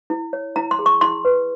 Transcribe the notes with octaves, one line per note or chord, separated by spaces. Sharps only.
E4
C#5
E4 A#5
C6
G#4
C#6
E4 C6
B4